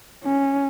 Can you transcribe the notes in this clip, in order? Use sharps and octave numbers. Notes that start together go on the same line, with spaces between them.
C#4